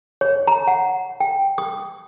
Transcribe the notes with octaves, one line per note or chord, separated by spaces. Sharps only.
C#5
A#5
F#5
G5
D#6